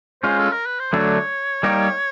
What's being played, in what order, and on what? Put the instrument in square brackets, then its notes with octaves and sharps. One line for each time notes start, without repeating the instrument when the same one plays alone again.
[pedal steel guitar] G#3 C#4 F4 [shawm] C5
[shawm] A4
A#4
B4
C5
[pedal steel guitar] D3 F#3 A3 D4 [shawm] C#5
[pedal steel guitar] G3 A#3 D#4 G4